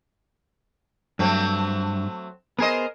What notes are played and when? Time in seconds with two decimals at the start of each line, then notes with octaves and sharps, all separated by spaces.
1.19 G2 F#3 A3 C4
2.59 B3 G#4 A#4 C5 D#5